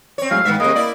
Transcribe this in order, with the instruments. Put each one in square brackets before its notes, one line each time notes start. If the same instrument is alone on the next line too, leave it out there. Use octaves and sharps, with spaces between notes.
[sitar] C4 C#5
[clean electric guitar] A2 F#3 G#3 [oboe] F5
[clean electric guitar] G#2 [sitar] D#3 B3 E5
[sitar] C3 G#3 [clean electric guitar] A#3 [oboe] D#5
[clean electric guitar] A#3 [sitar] E4 D5